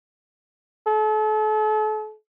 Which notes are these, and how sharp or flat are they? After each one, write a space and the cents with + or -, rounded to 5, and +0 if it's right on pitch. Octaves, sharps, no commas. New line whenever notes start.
A4 -40